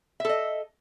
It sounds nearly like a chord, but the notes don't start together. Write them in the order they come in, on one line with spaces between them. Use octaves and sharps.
E5 A4 D#5